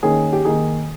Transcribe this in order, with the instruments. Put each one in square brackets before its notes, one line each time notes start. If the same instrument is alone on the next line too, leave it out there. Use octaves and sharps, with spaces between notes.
[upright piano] D#3 A#3 C#4 G#4
G4
D#3 A#3 D#4 G#4